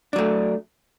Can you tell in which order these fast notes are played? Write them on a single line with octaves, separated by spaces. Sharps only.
D4 F#3 A3